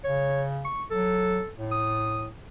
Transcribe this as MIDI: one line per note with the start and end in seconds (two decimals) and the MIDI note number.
0.04 0.67 49
0.04 0.44 73
0.65 0.84 85
0.91 1.40 54
0.91 1.51 69
1.58 2.28 45
1.72 2.25 87